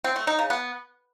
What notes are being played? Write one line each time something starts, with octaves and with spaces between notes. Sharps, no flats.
C4
A3
D#4
C#3
B3